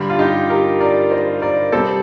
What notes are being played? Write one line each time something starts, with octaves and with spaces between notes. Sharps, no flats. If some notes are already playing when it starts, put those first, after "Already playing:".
Already playing: G2 D3 G3
F4
D#4 G4
G4 A#4
A#4 D5
C5 D#5
A#4 D5
C3 G3 C4 A4 C5